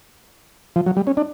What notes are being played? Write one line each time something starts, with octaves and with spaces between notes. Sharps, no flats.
F3
F#3
G3
C#4
D4